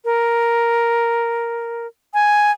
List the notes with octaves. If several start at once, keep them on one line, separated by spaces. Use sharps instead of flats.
A#4
G#5